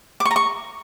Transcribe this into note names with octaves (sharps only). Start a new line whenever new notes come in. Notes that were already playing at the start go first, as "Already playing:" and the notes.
D6
C#6
A#5
C#6